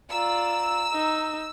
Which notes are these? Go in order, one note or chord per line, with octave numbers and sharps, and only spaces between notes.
F4 D5 A#5 E6
D#4